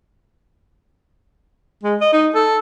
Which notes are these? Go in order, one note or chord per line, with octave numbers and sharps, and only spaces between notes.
G#3
D#5
D#4
A4